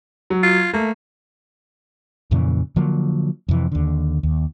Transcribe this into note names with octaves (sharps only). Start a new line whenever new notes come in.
F#3
F4
A3 A#3
F2 A#2 C#3 E3
D3 F3 F#3 A#3
F2 C3 E3
D#2 D3
D#2